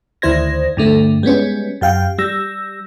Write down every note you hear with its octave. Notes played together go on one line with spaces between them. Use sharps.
D2 D#3 E4 C5 G#6 A#6
G2 D3 A3
G3 G#3 B3 C#4
F#2 G4 F5 G5
G3 E6 A#6